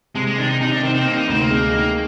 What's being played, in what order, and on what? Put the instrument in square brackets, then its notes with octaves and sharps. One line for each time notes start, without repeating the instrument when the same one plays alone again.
[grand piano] C3 [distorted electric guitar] G#3
[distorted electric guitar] G#3
[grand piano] D#3 [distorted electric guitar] D4
[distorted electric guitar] D#4
[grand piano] C3 [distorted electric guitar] D#4
[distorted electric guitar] D4
[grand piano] D#3 [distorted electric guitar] C4
[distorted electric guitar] C4
[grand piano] C3 [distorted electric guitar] A#3
[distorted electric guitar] D#4
[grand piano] D2 [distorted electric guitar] C4
[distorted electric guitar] A#3
[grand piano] G#3
D#3